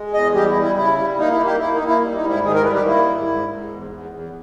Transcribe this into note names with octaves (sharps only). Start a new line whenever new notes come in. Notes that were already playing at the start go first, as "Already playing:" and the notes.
Already playing: G#3
E2 D#5
G3 G4
E4
G3
E4
C#3 E4
G3
A#3 D#4
E4
A#3
G4
A#3 E4
D#4
A#3
E4
G3
D#4
G#2
E4
D#3 G#4
A#4
G3 B4
G4
A#3 E4
G#2
G#2
G#2
E2
E2
E2